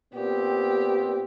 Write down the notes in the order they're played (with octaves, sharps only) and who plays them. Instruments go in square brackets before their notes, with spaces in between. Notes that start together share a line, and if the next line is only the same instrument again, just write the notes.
[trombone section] A#2 B3 C4 [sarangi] G4